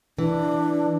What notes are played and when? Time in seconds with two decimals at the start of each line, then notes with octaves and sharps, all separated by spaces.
0.18 E3 D4